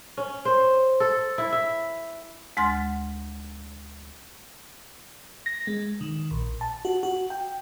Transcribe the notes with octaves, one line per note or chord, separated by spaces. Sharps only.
C#4
C5
A4
E4
E5
D2 G#3 F#5 C6 F6 A6
A#6
G#3
D#3
A#1
A5
F#4
F#4
G5